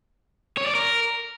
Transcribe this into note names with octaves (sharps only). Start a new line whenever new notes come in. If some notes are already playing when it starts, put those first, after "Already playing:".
C#5
D5
A#4